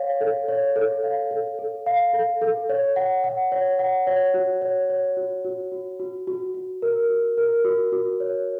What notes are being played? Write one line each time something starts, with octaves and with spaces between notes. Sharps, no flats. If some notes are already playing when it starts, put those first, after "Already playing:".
Already playing: C#5 F5
A4
C#5
A4
F5
A4
A4
F5
A4
A4
C#5
F#5
F#5
C#5
F#5
C#5
F#4
C#5
C#5
F#4
F#4
F#4
F#4
F#4
F#4
A#4
F#4
A#4
F#4
F#4
C#5